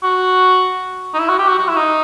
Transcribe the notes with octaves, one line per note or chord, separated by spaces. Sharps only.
F#4
D#4
E4
F#4
G4
F#4
F#4
E4
D#4